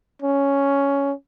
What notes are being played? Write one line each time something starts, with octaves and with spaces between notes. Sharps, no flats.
C#4